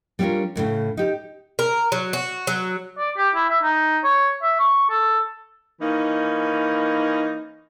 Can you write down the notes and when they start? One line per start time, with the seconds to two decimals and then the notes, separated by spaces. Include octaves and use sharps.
0.19 G3 B3 C#4 D4 F4 A#4
0.56 E2 A2 C#3
0.97 D#4 G4
1.59 A#4
1.92 F#3
2.13 F#4
2.47 F#3
2.99 D5
3.17 G4
3.35 E4
3.49 E5
3.63 D#4
4.04 C#5
4.42 E5
4.60 C#6
4.90 A4
5.81 E3 A#3 C#4 D#4